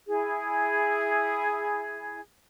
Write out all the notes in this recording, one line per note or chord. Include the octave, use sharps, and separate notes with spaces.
E4 G#4